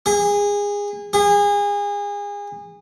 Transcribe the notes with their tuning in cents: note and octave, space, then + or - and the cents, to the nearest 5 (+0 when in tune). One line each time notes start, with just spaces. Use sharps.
G#4 -25
G#4 -30